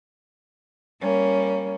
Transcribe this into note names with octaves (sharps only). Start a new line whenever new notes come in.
G3 A#3 C#4